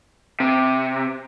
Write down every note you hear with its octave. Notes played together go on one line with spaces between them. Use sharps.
C3